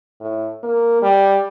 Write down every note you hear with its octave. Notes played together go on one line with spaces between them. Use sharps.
A2
A#3
G3